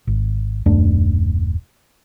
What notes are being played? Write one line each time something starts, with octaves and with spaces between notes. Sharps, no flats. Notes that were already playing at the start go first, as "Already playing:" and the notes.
G#1
D#1 F#2 A3 D4